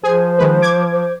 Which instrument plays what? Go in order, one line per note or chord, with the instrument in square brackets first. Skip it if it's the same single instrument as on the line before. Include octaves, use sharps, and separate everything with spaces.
[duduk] F3 [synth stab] G#4 G#5 [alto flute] C5
[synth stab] D#3 G#3 B4
D6 G#6
[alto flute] C5